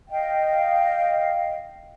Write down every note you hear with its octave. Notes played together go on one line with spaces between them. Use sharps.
D#5 F5 G5